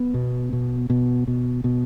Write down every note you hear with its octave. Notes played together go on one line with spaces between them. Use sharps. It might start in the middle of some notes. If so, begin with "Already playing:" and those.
Already playing: B3
B2
B2
B2
B2
B2